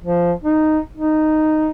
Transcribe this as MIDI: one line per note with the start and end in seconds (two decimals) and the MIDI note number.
0.04 0.32 53
0.44 0.79 63
0.97 1.71 63